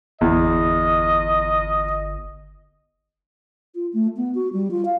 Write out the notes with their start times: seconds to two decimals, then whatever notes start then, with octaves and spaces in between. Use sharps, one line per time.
0.21 G1 E2 D#5
3.75 F4
3.93 A3
4.17 B3
4.35 F#4
4.53 G3
4.71 F4
4.85 F5